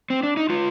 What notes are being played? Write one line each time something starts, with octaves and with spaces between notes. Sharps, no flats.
C4
D4
D#4
G#3 F4